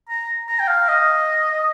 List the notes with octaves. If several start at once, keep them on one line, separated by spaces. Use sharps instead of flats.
A#5
A#5
G5
F5
D#5